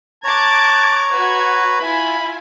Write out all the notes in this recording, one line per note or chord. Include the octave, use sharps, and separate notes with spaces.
C#5 A5 A#5 D6 F#6 G#6
F#4 B4 G#6
E4 F4 G#5 B5